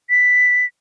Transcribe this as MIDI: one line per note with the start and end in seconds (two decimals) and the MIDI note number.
0.10 0.66 95